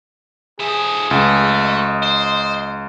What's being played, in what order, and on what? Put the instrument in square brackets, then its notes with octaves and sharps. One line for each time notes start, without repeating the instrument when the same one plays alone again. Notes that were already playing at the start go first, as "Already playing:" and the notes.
[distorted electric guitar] F3 E5 [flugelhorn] G#4
[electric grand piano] C#2 [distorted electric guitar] A3
[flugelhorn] D#5
[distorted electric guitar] C5